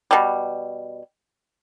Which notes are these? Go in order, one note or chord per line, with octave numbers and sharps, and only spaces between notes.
B2 G3